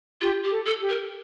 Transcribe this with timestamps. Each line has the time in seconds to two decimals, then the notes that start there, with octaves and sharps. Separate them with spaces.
0.21 F4 G4
0.44 G4
0.51 A4
0.66 A4
0.81 G4
0.89 A#4